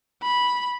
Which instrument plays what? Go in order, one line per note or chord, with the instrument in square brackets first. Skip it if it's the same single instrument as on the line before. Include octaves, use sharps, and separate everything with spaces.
[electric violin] B5